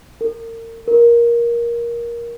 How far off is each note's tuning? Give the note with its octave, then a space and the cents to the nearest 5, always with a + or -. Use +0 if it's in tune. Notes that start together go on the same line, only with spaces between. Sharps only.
A#4 -35
A#4 +15